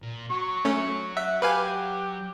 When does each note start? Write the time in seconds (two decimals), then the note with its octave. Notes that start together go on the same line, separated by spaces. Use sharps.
0.02 A#2
0.30 F#3 C#6
0.65 A3 C#4
1.17 E5 F#5
1.42 G4 B4 F5 G#5